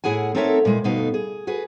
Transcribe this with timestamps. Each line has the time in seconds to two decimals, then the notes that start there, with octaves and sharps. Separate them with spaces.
0.04 A2 E4 G#4 F#5 G#5
0.35 C4 D#4 A4 A#4 C#5 E5
0.65 A#2 G#3 E4
0.84 D2 G2 B2 A3 D#4 F5
1.14 G#4
1.47 F#4 G#4 B4